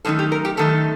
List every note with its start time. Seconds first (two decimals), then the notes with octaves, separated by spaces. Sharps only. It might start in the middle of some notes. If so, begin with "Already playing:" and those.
0.05 F#2 D#3 A3 D#4 A4
0.19 G4
0.32 A#4
0.45 G4
0.57 F#2 D#3 A3 D#4 A4